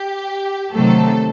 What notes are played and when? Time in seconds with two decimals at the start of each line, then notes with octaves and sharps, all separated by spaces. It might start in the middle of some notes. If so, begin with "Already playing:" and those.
Already playing: G4
0.73 C3 D#3 F#3 A3 A4